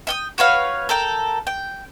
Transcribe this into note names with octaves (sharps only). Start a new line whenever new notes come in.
E5 G5 D#6
F#4 B4 C#5 F5
A4 A#4 G5
G5